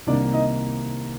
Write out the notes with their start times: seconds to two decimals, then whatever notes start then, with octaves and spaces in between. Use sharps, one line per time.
0.06 C2 C3 D#3 A#3 D4 D5
0.33 D#4 D#5